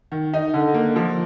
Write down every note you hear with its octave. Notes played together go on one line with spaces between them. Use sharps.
D#3
D#4
D3
A#3
F3